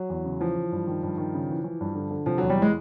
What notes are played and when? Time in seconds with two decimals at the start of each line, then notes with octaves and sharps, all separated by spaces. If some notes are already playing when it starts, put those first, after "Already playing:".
Already playing: F#3
0.10 E2
0.24 C#3
0.40 E3 F3
0.56 E3
0.72 G2
0.87 D#3
1.03 G2
1.18 D#3
1.34 C#3
1.49 E3
1.64 E3
1.81 G2
1.95 D3
2.11 D3
2.26 C3 F3
2.38 E2 F#3
2.50 G3
2.57 E3 G#3